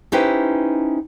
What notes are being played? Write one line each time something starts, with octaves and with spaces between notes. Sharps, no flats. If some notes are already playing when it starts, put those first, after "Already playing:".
C#4 D#4 E4 G4 B4 C5